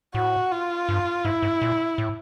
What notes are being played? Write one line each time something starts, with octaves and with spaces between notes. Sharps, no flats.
A2 F#4
F4
G2
G#2 E4
G#2
A#2
A2